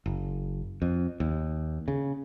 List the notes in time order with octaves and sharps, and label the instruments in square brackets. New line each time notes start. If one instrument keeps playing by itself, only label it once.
[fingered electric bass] F#1
F2
D#2
C#3